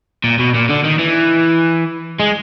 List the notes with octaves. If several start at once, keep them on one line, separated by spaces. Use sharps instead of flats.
A#2
B2
A#2
D3
D#3
E3
G#3